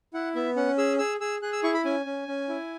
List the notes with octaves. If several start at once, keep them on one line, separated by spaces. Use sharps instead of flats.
E4 F#5
B3 E5
C#4 F#5
G#4 E6
G#4 E6
G#4 E6
G#4 F#6
E6
E4 C#6
B5
C#4 G#5
C#4
C#4
E4